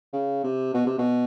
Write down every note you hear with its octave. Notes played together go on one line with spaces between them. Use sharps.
C#3
C3
B2
C3
B2